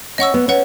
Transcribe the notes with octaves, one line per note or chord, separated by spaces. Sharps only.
C#4 D#5 F#5 C#6 E6
B3
C#4 B4 F#5